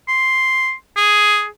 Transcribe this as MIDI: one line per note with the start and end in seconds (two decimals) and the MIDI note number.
0.08 0.72 84
0.96 1.46 68